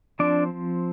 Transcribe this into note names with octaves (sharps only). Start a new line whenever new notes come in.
F3 C4 D4 D5